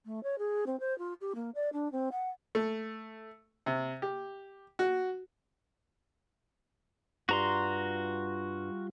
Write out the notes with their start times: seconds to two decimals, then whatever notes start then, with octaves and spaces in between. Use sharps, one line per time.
0.06 A3
0.23 C#5
0.38 G#4
0.67 C4
0.80 C5
0.98 F4
1.21 G4
1.35 A#3
1.55 D5
1.73 D4
1.92 C4
2.12 F#5
2.55 A3
3.66 C3
4.02 G4
4.79 F#4
7.29 G2 G3 F4 F#4 A#5 C6